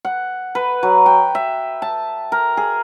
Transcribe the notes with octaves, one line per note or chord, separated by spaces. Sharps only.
F#5
B4
F#3
G5
E5
A5
A#4
G#4